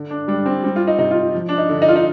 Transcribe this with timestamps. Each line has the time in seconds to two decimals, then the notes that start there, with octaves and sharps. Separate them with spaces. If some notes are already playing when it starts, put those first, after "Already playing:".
Already playing: D3
0.11 D4
0.28 G3 D4
0.46 C4
0.64 G3 C4
0.76 F4
0.87 D#4
0.98 C3 D#4
1.11 F4
1.34 F3
1.49 D4
1.58 D#4
1.69 D3
1.82 D#4
1.88 F4
1.96 D#4